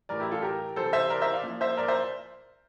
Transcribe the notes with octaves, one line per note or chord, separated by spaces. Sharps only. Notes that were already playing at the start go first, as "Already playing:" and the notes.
A2 E3 G3 A#4 D5
E4 G4
F4 A4
G4 A#4
C3 E3 G3 A4 C5
C5 E5
A#4 D5
C5 E5
D5 F5
A#2 F3
C5 E5
A#4 D5
C5 E5